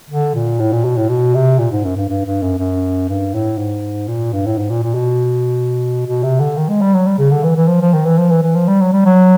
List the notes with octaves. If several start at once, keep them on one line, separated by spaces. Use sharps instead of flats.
D3
A#2
A2
A#2
B2
A2
B2
C3
A#2
G#2
F#2
G2
G2
G2
F#2
F#2
G2
A2
G#2
A#2
G2
A2
G#2
A#2
A#2
B2
B2
C3
D3
D#3
G#3
G3
F#3
G3
C#3
D3
E3
E3
F3
F3
D#3
E3
F3
E3
E3
F3
G3
F#3
G3
F#3